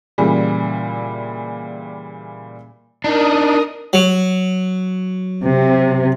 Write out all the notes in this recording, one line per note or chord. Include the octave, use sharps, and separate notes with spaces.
A#2 C#3 E3 G3
D4 D#4 A#4 D#6
F#3
C3